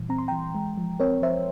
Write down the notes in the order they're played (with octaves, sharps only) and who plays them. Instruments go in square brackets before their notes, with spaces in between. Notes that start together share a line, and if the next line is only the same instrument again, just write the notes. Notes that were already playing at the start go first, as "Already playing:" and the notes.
Already playing: [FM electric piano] A#2 E3 G3
C4 A#5
C6
E3 G5 A#5
G#3
F3
C4 A#4 C#5
F3 C5 E5